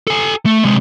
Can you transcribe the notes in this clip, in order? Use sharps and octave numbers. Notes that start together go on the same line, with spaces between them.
A4 G#5
A3
C3 G#3